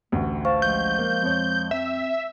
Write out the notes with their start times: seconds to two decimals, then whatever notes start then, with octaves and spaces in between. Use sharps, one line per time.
0.12 A1 D2 A3
0.45 C5 F5 A5 C#6
0.62 F3 G#3 G6
0.99 A#3
1.23 F2 C#5
1.71 C4 E5